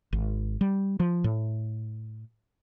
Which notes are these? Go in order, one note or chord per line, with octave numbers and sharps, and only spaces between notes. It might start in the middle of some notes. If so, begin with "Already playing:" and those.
G#1
G3
F3
A2